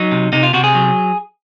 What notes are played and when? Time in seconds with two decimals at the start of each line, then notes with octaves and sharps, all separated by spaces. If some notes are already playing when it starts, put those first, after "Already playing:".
Already playing: F#3 D#4
0.12 C3
0.33 C3 D#4
0.43 F4
0.54 C3 F#4
0.64 G#4
0.75 F#3